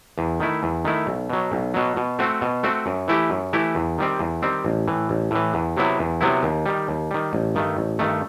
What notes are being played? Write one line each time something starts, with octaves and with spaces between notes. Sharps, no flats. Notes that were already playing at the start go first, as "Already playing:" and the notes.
E2
D#3 A3 E4
E2
D#3 A3 E4
B1
B2 F#3
B1
B2 F#3
B2
A3 C4 F#4
B2
A3 C4 F#4
F#2
E3 A3 E4 G4
F#2
E3 A3 E4 G4
E2
D#3 G3 C4
E2
D#3 G3 C4
A1
A2 E3
A1
A2 E3
E2
C3 F#3 B3 E4
E2
C3 F#3 B3 E4
D#2
D#3 G3
D#2
D#3 G3
A1
G2 D#3 A3
A1
G2 D#3 A3